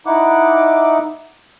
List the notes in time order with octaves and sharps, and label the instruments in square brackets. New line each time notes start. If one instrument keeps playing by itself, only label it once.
[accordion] D#4 E4 F#5 D6